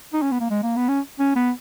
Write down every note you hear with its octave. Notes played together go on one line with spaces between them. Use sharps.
D#4
C#4
B3
A#3
G#3
A#3
B3
C#4
C#4
B3